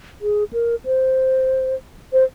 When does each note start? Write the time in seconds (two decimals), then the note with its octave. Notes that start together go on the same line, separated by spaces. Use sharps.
0.22 G#4
0.53 A#4
0.85 C5
2.13 C5